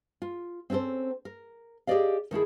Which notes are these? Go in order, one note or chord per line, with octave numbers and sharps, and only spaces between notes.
F4
C4 C#4 F4 A4 C5
A#4
G4 G#4 B4 D5 D#5 F5
D#3 A3 E4 G#4